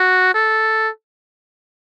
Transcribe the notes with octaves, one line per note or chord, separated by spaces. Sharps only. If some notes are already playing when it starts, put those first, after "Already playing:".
Already playing: F#4
A4